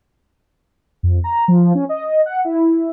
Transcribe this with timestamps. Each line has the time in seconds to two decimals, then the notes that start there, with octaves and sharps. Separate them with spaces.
1.03 F2
1.24 A#5
1.48 F3
1.75 C#4
1.89 D#5
2.26 F#5
2.44 E4